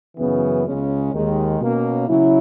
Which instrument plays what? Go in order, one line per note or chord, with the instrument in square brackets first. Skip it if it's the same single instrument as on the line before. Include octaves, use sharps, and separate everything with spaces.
[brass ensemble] F#2 C#3 E3 B3
C#2 C#3 G#3 C#4
D#2 D#3 G#3
B2 A#3 C#4
C#3 F#3 C#4 E4